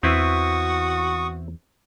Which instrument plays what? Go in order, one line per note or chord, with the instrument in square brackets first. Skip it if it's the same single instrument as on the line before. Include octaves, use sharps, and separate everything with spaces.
[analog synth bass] E2 [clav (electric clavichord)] C4 E4 B4 [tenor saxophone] F#4 [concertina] C#6 D#6